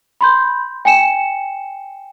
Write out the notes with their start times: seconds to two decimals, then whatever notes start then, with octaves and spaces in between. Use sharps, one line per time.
0.21 B5 C6 G6
0.85 G5 G#5 C#7 E7